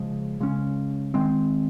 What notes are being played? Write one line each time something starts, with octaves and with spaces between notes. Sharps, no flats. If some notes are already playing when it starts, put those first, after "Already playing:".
Already playing: C#3 F3 G#3
C#3 G#3 C#4
D#3 G#3 C4